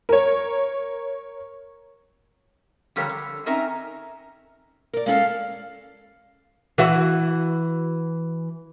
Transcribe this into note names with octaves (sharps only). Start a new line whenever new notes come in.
A#4 C#5
D3 F3 G3 A#4 C#5
D3
C4 C#4 D#4 A#4 E5 A#5
A#4 D5
G#3 C#4 A4 F5
E3 E4 F#4